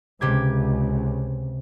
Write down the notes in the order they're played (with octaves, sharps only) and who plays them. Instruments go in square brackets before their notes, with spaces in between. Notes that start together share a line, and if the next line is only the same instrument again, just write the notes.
[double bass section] C#2 [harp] C3 G4 G#6